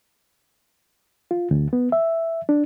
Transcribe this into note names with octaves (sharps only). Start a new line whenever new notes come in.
F4
D2
B3
E5
D4